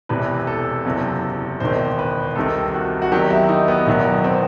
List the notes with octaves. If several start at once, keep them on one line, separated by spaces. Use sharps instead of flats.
E1 E2 C3 E3 B4
A4
F#1 E2 C3 F#3
E1 E2 D#3 C5
B4
C2 C3 D#3 A4
F#4
F#4
E2 D#3 F#3 G4
E4
D#4
B3
E1 E2 D#3 F#3 B3
C4